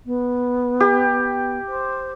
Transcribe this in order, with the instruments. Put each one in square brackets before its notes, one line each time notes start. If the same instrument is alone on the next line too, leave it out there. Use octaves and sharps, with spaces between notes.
[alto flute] B3
[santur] G4
[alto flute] C5